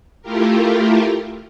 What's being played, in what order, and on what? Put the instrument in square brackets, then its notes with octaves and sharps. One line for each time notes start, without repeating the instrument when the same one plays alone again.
[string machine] A3 E4 F4 G4 A#4